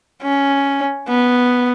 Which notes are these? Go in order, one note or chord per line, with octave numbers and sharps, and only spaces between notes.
C#4
B3